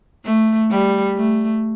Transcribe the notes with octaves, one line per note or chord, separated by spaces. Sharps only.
A3
G3
A3